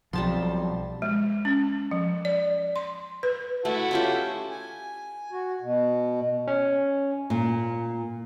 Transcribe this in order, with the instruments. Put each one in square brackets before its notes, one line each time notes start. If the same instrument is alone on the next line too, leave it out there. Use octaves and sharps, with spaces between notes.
[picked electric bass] B1 [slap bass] F3 C4 [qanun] G3 A5 C6
[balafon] G#3
C#4
F3
D5
C6
B4
[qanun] A3 [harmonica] E4 F#4 A4
[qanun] C#4 F4 G4
[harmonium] G#5
F#4
B2
[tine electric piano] C#4
[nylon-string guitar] A#2